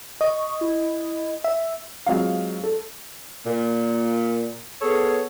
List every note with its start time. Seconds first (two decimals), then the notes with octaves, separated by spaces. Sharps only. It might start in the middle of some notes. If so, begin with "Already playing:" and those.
0.21 D#5 C#6
0.61 E4
1.44 E5
2.06 F#3 G#3 C4 F4 F5
2.63 A4
3.47 A#2
4.82 B3 G#4 A4 C#5